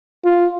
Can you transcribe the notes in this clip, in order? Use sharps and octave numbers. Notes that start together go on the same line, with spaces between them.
F4